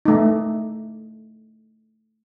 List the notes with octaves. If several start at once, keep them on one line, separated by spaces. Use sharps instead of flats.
A3 D#4